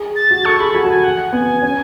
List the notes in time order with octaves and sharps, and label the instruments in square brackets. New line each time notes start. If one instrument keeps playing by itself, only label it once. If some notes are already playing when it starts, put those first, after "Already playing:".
Already playing: [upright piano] G#4
[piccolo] A6
[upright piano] F#4
[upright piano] A4 [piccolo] C#6
[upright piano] G#4 [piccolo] B5
[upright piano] F#4 [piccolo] G#5
[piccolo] A5
[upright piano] F#4
[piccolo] G#5
F#5
[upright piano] B3 [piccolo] G#5
[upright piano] C#4 [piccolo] G#5